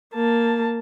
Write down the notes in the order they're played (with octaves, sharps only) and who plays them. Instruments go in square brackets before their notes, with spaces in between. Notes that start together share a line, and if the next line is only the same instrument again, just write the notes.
[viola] A#3 A5